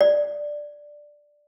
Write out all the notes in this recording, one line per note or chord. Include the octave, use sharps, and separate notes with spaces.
D5